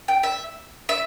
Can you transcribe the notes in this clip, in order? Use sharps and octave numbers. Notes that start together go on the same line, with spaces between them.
G5
E5
E5